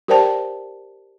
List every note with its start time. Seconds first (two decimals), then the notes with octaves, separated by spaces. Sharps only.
0.08 G4 A#4 C5 D5 G5 A5